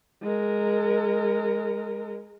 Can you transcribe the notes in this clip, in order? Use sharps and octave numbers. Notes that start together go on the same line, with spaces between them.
G#3 A#4